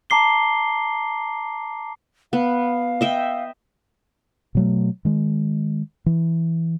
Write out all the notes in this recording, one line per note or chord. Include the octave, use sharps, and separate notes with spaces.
A5 A#5 D6 C7 G7
B3 F5
D#5 E5 G5
B2 F#3 A3
D#3 G#3
E3